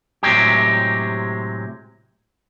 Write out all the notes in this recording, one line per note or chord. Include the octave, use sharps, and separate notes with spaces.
A2 C3 F#3 G#3 G4